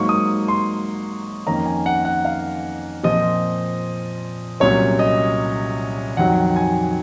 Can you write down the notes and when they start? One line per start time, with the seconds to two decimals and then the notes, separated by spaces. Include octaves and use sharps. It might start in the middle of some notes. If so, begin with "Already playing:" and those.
Already playing: G#2 F#3 A#3 D#4 C#6
0.09 D#6
0.48 C6
1.46 F2 D#3 A#3 C#4 A#5
1.66 G#5
1.86 F#5
2.05 F#5
2.25 F5
3.03 A#2 F3 C4 D#5
4.60 C2 A#2 F#3 C#4 C#5
4.99 D#5
6.17 F2 D#3 F#3 F#5
6.56 G#5